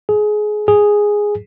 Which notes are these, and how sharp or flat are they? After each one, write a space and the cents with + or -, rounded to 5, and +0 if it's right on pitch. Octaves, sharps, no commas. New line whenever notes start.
G#4 +20
G#4 -5